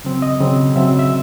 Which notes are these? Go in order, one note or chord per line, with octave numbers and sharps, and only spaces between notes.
C#3 F#3 C4
D#5
C#3 F#3 C4
C#3 F#3 C4 E5
E5